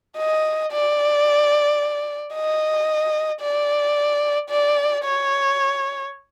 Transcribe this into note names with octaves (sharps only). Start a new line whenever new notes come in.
D#5
D5
D#5
D5
D5
C#5